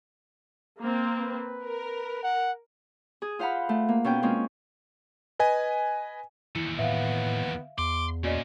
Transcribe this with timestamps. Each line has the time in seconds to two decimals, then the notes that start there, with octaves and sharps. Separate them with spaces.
0.79 A#3 C4
1.18 B4
1.65 A#4
2.24 F#5
3.22 G#4
3.39 F4 C5 F5 F#5 B5
3.69 A3
3.89 A#3
4.04 B2 C#4 G5
4.22 G#3 A#3 C4 C#4 F4
5.39 B4 D#5 G#5
6.55 D#2 E3 E4 C#7
6.79 A2 B3 E5 F5
7.78 E2 C6 D6
8.24 A#2 C#4 F#4 D5 D#5